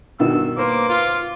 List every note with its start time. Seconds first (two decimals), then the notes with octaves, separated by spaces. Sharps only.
0.19 G2 B2 D#3 E6
0.58 A#3 B4 C5 C6 D6
0.89 F4